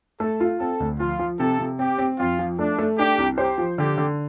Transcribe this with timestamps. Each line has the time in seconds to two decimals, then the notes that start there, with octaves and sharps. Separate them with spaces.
0.20 A3 A4
0.40 F4
0.60 C4 A4
0.80 D2
0.99 F3 F4
1.19 F3
1.39 C3 A4
1.59 C3
1.79 C4 G4
1.98 C4
2.19 F2 F4
2.39 F3
2.59 A3 D4
2.79 A3
2.98 D4 G4
3.18 C2
3.38 G4 C5
3.58 F3
3.78 D3 G4
3.98 D3